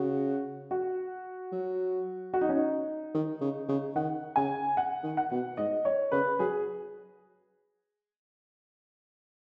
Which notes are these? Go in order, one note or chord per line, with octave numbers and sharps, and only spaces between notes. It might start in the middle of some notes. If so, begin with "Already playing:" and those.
Already playing: C#3 F#4
F#4
F#3
F#4
D#4
C#4
D#4
D#3
C#3
C#3
D#3 F#5
C#3 G#5
F#5
D#3
F#5
B2
G#2 D#5
C#5
C#3 B4
F#3 G#4